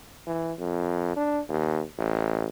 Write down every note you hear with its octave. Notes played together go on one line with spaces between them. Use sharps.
E3
F2
D4
D#2
A1